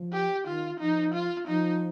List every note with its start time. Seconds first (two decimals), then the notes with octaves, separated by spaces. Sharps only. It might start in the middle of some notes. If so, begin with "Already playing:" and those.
Already playing: F3
0.13 G4
0.46 D#3 F4
0.80 F3 D#4
1.14 F4
1.47 F3 D#4